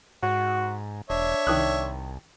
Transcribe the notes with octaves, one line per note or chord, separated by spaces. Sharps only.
G#2 F#4
E1 D4 C#5 E5
C2 D#3 D#6 F#6